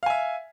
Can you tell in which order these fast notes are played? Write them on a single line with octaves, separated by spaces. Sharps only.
F5 G#5 E5